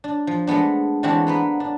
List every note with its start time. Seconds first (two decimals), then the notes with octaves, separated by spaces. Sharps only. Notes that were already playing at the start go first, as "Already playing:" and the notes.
0.04 D4
0.27 F3
0.47 G#3 A3 B3 D4
1.03 D3 E3 G#3 C4 D4 F#4
1.27 A#3 B3 B4
1.60 D4